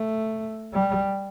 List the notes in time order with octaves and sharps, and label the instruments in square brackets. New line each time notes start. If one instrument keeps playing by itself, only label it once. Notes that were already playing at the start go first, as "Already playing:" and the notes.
Already playing: [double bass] A3
G3